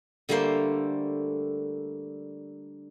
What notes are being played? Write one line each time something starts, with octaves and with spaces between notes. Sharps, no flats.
D3 G3 A3 A#3 C5